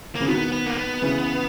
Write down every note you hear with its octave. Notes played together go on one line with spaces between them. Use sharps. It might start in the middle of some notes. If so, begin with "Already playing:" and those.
A#3
C#3
B2 D#3 B3
B3
A#3
B3
C#3 E3